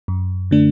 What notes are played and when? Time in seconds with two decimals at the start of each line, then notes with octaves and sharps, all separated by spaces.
0.08 F#2
0.51 D3 A3 D4